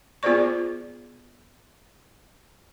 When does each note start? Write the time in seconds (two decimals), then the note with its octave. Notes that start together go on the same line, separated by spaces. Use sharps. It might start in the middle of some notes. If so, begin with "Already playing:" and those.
0.23 B3 F4 G#4 C5 D5 C#6